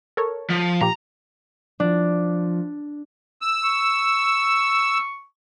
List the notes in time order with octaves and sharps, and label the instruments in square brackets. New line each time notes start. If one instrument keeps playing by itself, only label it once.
[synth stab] A4 A#4 C#5
[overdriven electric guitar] F3
[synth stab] A#2 F3 G4 [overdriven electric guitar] A#5
[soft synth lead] F3 [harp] D4
[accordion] E6
[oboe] C#6